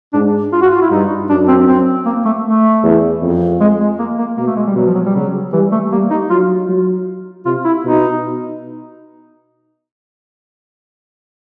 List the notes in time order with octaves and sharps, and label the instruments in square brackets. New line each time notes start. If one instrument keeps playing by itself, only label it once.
[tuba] G#2 [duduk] D4
[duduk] F4
F#4
F4
E4
[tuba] G2 [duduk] D#4
[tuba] F#2 [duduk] D4
[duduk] C4
C4
A#3
A3
A3
[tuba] E2
F2
[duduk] G#3
G#3
A#3
A#3
[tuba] B2 [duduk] A#3
[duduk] A3
G#3
G3
[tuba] B2 [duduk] F#3
[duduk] F3
F#3
G3
[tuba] C#3 [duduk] F#3
[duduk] E3 [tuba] G3
[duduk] A3
[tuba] G3 [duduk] A#3
[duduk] D#4
[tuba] F#3 [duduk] F4
[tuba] F#3
[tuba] C3 [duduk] F4
[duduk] E4
[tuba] B2 [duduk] D#4